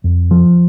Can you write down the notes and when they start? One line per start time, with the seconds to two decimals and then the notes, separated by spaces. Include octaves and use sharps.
0.04 F2
0.31 F3